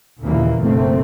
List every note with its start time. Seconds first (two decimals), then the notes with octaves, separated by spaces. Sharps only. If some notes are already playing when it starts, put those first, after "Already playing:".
0.21 D#2 A#2 C#3 E3 A#3
0.60 F#1 B2 D3 A3 A#3 C4